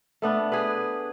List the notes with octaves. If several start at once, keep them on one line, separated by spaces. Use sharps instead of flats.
A3 B3 D4
G#4 B4